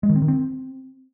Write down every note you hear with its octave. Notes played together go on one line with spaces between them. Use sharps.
G#3
D#3
C4
D#3
C4